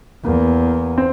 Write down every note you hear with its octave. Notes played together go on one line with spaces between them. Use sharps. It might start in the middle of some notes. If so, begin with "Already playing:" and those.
E2 A#3
C4